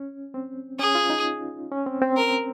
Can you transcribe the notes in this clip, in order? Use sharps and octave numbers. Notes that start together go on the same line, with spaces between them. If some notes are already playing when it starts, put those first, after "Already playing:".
Already playing: C#4
C4
C#4 G#4
F4
D#4
C#4
C4
C4
A#4